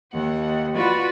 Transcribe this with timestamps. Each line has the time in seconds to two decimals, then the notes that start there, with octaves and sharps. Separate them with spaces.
0.12 D#2 F#5
0.76 F4 F#4 B4 D5 B5